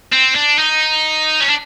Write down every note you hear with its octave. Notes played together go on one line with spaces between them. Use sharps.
C4
D4
D#4
C#4
D4